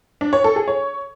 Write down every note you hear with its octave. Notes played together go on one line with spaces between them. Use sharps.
D4
C#5
A4
G#4
C#5